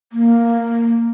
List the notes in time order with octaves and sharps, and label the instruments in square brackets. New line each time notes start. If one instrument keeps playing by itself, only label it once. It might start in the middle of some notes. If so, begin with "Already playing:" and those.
[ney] A#3